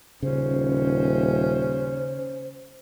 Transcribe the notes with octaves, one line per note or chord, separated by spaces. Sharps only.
D#1 C#3 C#4 C5